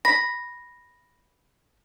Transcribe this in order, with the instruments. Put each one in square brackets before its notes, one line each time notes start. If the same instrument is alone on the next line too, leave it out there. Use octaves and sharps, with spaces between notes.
[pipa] B5 [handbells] A#6